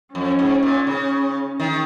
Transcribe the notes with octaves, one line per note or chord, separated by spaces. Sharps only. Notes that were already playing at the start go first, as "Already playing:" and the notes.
F2 C#4
G#2
A#2
C#3 C#4
D#3